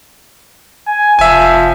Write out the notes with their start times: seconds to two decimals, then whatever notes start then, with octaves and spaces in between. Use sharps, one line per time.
0.87 G#5
1.19 F1 F3 E5 G#5